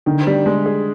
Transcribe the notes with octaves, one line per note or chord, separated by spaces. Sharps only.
D3 D#3
G3
G#3
G#4